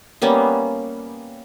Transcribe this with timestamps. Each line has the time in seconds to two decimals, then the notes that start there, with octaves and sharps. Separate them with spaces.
0.22 G3 A#3 B3 C#4